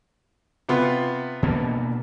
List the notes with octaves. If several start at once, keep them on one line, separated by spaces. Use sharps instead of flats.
C3 B3 F4
B2 D3 A#3